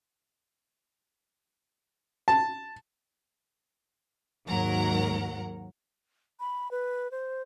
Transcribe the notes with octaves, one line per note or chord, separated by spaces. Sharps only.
A5
D#2 G#2 F#3 A#4 F#5 A#5
B5
B4
C5